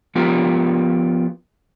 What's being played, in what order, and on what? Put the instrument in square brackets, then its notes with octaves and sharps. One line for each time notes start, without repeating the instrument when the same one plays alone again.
[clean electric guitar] F3 B3 F4 G4 A#4